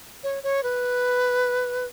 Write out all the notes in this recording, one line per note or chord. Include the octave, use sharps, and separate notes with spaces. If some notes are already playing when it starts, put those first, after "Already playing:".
C#5
C#5
B4